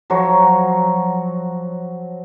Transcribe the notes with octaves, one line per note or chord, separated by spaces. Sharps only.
F3 F#3 F#4 C#5